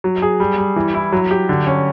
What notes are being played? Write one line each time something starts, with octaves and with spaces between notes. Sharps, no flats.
F#3
G#4
G3
G3
E3
E4
F#3
G4
D3
C#4